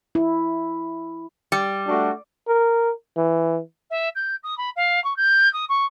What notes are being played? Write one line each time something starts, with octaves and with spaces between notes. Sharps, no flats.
E4
G3
A3 D4 F#4
A#4
E3
E5
G6
D#6
B5
F5
C#6
G6
D#6
C#6